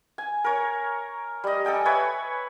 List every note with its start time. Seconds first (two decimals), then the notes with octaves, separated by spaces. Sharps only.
0.18 G#5
0.44 A#4 C#5
1.44 G3 D#5
1.65 A4 D#5 G5 G#5
1.85 B4 C#5 E5 G#5